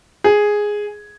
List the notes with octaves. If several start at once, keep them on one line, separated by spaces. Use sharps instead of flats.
G#4